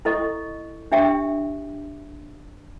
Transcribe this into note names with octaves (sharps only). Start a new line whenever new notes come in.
E4 A4 D#5 C#6
D4 G4 E5 G5